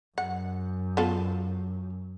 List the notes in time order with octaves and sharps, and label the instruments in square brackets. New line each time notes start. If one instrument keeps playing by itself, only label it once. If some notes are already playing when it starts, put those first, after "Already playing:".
[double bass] F#2 [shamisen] F#5
[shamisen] B3 F4 A4